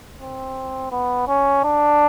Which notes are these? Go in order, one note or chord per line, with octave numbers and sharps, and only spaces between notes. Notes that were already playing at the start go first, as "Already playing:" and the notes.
C4
B3
C#4
D4